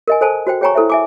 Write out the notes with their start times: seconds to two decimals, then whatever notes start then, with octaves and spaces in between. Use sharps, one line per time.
0.08 A#4 D#5 G#5
0.21 A4 C5 G#5 A5
0.47 F#4 C5 G5
0.61 G#4 C#5 G5 G#5 A#5 C#6
0.75 E4 A4 C5 E5
0.90 E5 G#5 D6